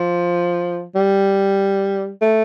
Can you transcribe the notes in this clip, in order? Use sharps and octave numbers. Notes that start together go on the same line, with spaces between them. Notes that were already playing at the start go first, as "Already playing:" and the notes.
Already playing: F3
G3
A3